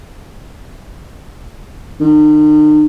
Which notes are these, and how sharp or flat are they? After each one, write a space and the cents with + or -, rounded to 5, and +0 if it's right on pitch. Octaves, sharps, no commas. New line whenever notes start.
D#3 -45